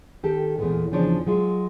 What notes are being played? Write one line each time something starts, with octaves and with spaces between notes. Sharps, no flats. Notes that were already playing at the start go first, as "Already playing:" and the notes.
D#3 G4 A4
E2 A#2 C#3 G#3 A3 B3
E2 C#3 F3 D4 C#5
F#3 G#3 F4